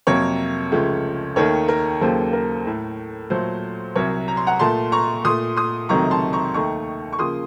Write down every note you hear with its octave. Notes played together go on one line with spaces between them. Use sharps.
F2 C3 F#3 A#3 A#4 C#5
C#2 C#3 F3 A3
D#2 D#3 A3 A#4 C#5
A#4
D#2 C#3 F#3 A#3 A4 C5
A#4
A2 A3
A#2 F#3 A3 A4 C5
C2 C3 F#3 A#4 C#5
A#5
C6
F#5 A#5
A#2 A3 A5 C6
A#5 C#6
A#2 A3 C6 D#6
C6 D#6
C#2 C3 D#3 F#3 A3 A#5 C#6
A5 C6
A#5 C#6
D#2 D#3 A3 A#5 C#6
C#6
C#3 F3 A#3 C6 D#6